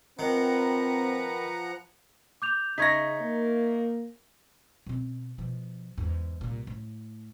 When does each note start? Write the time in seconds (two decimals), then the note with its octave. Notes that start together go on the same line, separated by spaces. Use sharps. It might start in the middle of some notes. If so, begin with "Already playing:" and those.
0.19 D#3 F3 C4 B4 F#5 A#5
2.42 D6 G6 F7
2.78 C#3 D#4 E5 C#6 G#6 A#6 B6
3.21 A#3
4.86 B2 C4
5.38 B2 F3
5.98 E2 G#2
6.41 C2 A#2
6.67 A2